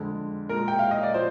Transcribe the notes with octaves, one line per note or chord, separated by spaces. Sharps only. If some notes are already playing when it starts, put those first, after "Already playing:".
Already playing: F2 D3 G#3
A#2 G#3 A#4
G5
F5
D#5
D5
A#2 F3 C5